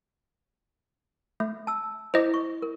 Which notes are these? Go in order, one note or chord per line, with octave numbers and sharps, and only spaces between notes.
A3
A5 E6
E4 C5 D#5 D6
C#6
A#4